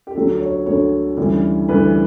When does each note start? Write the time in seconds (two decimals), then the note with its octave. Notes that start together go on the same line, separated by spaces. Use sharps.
0.07 G4
0.15 D2 D3 F#3 A4
0.41 C#5
0.66 D2 D3 F#3 C#5
1.17 D2 C#3 E3 G3
1.69 D2 C#3 E3 G3 B4